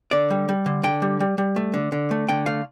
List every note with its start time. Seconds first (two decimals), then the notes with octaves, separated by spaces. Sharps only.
0.11 D3 D5
0.30 G3
0.49 G3
0.66 D3
0.83 D3 G5
1.02 G3
1.20 G3
1.38 G3
1.56 A3
1.74 D3
1.92 D3
2.11 A3
2.29 D3 G5
2.46 A3 F5